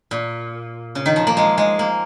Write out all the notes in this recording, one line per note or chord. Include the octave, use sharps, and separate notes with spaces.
A#2
C#3
D#3
F3
A#3
G#3
G#3
A#3